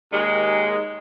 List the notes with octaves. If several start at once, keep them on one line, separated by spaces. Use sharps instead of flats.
D#2 G#3